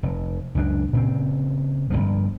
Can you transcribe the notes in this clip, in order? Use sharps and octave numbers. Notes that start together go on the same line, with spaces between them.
F1
C#2 F#2 F#3 D4
A#2 C#3 C4
G1 E2 G2 F3